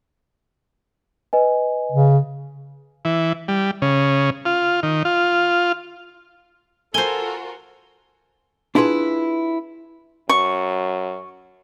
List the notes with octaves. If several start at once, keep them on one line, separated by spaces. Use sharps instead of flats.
B4 D#5 G#5
C#3
E3
G3
C#3
F4
D#3
F4
F4 F#4 A4 A#4 C5 G#5 G7
D4 E4 F4 G#4 B4
F#2 C#6